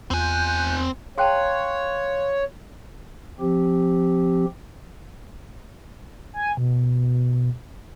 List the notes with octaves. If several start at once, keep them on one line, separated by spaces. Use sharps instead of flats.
E2 C4 F4 G#5 F#6 G6
G#4 C#5 F5 G5 A5 C6 F#6
F3 C4 G4
G#5
B2